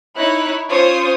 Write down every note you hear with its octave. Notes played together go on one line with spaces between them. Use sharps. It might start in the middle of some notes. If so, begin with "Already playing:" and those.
D#4 E4 C#5 F#6
C#4 F4 C5 C#5 D#6